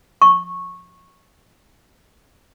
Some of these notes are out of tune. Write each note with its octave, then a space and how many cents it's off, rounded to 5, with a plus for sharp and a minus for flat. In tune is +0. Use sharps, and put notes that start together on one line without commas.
C#6 -10